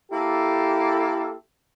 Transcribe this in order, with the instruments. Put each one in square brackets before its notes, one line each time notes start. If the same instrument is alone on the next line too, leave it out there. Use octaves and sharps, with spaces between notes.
[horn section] A#3 E4 G4 A4